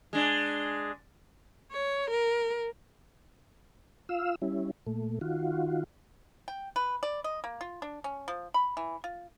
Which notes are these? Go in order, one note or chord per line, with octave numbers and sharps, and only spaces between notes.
G#3 D4
C#5
A#4
F4 F5 E6
G3 C#4 E4
A#2 A3
D#3 F4 F#4
G5
B4
D5
D#5
A#3
F4
D4
C#4
F3
B5
E3
F4